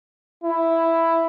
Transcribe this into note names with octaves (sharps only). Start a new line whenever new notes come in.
E4